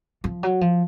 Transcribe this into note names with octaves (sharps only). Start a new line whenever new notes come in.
F3
F#3
F3